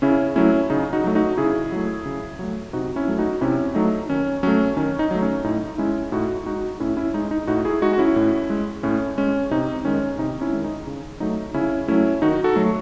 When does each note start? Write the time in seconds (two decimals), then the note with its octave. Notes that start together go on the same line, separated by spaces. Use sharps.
0.02 C#3 C#4 E4
0.36 F#3 A3 C#4 E4
0.70 C#3 D#4
0.93 D#4 F#4
1.04 F#3 A3
1.15 D#4 F#4
1.37 C#3 E4 G#4
1.72 F#3 A3
2.06 C#3
2.39 F#3 A3
2.73 C3 D#4 F#4
2.96 C#4 E4
3.08 F#3 A3
3.18 D#4 F#4
3.41 C3 C#4 E4
3.75 F#3 A3 D#4
4.09 D#3 C#4
4.43 F#3 A3 C#4
4.77 D#3 C#4
4.99 D#4
5.11 F#3 A3
5.22 C#4
5.44 A2 D#4
5.78 G#3 C#4 E4
6.12 A2 D#4 F#4
6.46 G#3 D#4 F#4
6.80 A2 C#4 E4
6.97 C#4 E4
7.14 G#3 D#4
7.31 D#4
7.47 A2 D#4 F#4
7.65 E4 G#4
7.82 G#3 D#4 F#4
7.93 F#4
7.98 C#4 E4
8.16 A2
8.50 G#3
8.83 A2 C#4
9.18 G#3 C#4
9.51 C3 D#4
9.85 D#3 G#3 C#4
10.18 C3 D#4
10.41 C#4 E4
10.53 D#3 G#3
10.64 D#4
10.87 C#3
11.20 F#3 A3 D#4
11.54 C#3 C#4 E4
11.88 F#3 A3 C#4 E4
12.22 D#3 D#4 F#4
12.44 F#4 A4
12.56 F#3 A3